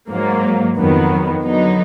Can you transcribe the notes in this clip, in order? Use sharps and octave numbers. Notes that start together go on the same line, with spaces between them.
G#2 F#3 A#3
F2 D#3 F#3 B3
D3 F#3 B3 D#4